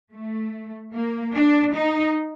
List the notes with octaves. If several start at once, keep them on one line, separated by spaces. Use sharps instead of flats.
A3
A#3
D4
D#4